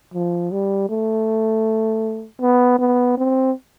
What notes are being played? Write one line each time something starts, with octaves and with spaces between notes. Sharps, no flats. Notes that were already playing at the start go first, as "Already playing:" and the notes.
F3
G3
A3
B3
B3
C4